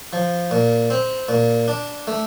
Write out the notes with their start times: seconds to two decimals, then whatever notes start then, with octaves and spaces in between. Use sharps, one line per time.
0.13 F3
0.51 A#2
0.90 C4
1.29 A#2
1.68 D4
2.07 A3